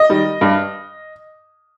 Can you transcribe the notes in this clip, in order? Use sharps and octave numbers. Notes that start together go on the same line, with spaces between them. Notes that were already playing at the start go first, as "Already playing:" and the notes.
Already playing: D#5
D#3 G3
G2